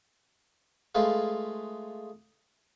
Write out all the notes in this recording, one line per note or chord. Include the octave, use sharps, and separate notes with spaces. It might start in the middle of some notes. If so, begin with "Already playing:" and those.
G#3 A3 F4 G#4 B4 F5